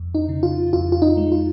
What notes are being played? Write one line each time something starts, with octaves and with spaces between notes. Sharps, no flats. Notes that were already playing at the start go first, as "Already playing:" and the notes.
Already playing: F2
D#4
C#3
F4
F2 F4
F4
D#4
G#3
F4